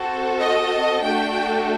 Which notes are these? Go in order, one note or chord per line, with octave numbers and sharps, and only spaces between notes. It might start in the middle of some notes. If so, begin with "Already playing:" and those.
Already playing: C4 F#4 A4
D#5
A3 D4 F#4 A4 G5